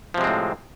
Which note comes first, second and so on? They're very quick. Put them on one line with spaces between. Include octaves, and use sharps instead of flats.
F3 C3 G#3 C4 A2